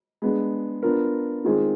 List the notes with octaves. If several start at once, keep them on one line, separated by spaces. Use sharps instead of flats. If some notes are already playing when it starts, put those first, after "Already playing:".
G#3 B3 D4
B3 D4 F4 A#4
D#3 G#3 C4 F4 G#4